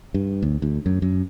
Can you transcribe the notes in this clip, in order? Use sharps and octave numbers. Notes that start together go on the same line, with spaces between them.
G2
D2
D2
F#2
F#2